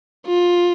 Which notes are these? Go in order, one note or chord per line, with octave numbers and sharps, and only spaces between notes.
F4